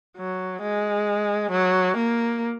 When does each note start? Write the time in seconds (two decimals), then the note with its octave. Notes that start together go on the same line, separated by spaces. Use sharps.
0.18 F#3
0.62 G#3
1.51 F#3
1.97 A#3